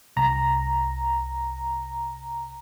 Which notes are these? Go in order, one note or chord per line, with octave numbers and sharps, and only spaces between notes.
C2 A#5